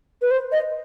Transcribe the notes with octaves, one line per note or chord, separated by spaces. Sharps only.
B4
C5
D#5